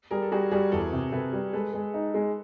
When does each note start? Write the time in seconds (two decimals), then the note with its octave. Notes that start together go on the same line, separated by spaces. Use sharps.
0.11 G3 G#4 A#4
0.22 A4
0.32 G3 F#4 G#4
0.51 G3 F#4 G#4
0.72 E2 A4 B4
0.93 C3
1.12 C3 A4 B4
1.33 G3
1.53 G#3 A4 B4
1.74 G#3
1.94 D#4
2.14 G#3